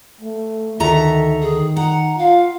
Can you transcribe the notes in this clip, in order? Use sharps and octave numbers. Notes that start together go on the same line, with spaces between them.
A3
D2 D#3 A4 E5 A#5
D#3 G#4
F#5 A#5
F4 F5